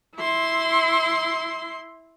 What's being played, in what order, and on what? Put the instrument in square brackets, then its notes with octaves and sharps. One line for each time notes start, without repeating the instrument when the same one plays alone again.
[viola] E4 C6